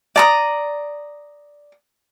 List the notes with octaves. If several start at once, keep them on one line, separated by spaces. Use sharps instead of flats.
D5 A#5 D#6